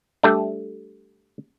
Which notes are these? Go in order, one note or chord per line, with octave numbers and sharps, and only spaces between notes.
G3 A3 D4